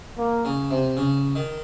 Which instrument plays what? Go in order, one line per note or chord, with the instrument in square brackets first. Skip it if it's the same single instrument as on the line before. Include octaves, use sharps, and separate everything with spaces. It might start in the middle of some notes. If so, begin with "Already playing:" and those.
[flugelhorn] A#3
[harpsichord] C#3
C3
C#3
D#3